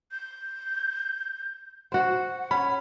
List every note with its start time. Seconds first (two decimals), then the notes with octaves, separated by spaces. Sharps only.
0.11 G6
1.92 F#4 C5 F#5
2.51 C#4 B5